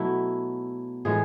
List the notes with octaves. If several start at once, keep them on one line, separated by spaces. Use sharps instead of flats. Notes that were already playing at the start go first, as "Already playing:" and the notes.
Already playing: B2 F#3 A3 E4
A2 E3 G#3 G#4